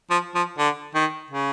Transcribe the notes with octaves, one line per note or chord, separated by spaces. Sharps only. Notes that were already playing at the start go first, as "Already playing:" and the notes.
F3
F3
D3
D#3
C#3